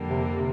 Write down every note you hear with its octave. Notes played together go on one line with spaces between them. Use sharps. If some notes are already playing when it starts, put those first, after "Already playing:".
Already playing: F2 D3 G3 A#3
C3
C3